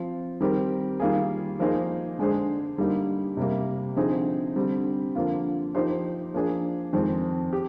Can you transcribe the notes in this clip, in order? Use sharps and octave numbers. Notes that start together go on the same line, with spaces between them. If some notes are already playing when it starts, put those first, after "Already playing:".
Already playing: F3 C4 F4 C5
D#3 G3 C4 G4 A#4
D#3 G3 A#3 F4 G#4
F3 A#3 D#4 G#4 C5
D3 G#3 D4 G#4 C5
D3 G3 A#3 D#4
C3 G3 A#3
D3 F3 C4 D#4 G#4
D3 G3 C4
D3 F3 A#3 F4
F3 A#3 D#4 G4 C5
F3 A#3 D4 G#4
F2 D#3 G#3 C4
G4